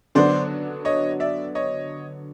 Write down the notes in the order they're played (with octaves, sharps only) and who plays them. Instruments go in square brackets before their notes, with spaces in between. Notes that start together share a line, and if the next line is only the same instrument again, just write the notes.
[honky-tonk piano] D3 F#3 B3 D4 F#4 [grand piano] C5 D5
[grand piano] C#5 D#5
D5 E5
C#5 D#5